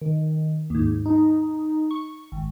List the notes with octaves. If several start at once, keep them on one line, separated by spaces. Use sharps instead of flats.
D#3
D#2 G#2
D#4
C#6
G#1